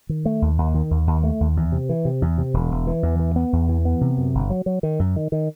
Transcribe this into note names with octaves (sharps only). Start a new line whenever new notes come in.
D#3
A3
D#2
D#2
D#3
D#2
D#2
A3
D#2
E2
C3
E3
C3
E2
C3
E1
E1
E3
E2
E3
B3
E2
E3
B3
C3
F#2
G1
F#3
F#3
D#3
F#2
D#3
D#3